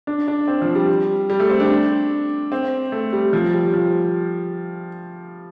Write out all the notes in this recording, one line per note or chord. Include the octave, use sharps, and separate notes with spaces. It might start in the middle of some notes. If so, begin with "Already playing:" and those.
D4
D4
C4
F3
G3
G3
A3
C4
D4
C4
A3
G3
F3
G3
F3